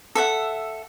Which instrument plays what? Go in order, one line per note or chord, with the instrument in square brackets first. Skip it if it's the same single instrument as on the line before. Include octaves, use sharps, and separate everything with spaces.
[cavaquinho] A4 E5 F#5